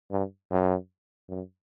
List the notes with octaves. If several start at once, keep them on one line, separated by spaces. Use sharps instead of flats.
G2
F#2
F#2